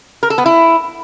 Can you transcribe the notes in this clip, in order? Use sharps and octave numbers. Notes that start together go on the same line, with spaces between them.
A#4
A4
B3
E4